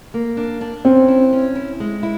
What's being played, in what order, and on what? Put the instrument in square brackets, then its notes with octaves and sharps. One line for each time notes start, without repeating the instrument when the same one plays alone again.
[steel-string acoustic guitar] A#3
D4
D4
[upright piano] C4 [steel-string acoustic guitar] C#4
[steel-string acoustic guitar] E4
C#4
E4
G#3
E4